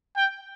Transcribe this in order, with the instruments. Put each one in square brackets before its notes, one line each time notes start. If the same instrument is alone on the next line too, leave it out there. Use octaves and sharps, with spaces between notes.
[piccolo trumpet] G5